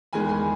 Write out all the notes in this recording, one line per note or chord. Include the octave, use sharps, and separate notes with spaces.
E2 D#3 G#3 G#5 B5
G#5 B5